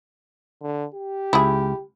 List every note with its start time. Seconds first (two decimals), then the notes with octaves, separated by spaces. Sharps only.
0.62 D3
0.94 G4
1.33 C#2 E4 G#4